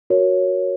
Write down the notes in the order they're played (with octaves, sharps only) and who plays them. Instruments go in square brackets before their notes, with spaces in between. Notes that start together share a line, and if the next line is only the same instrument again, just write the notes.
[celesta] F#4 A#4 C#5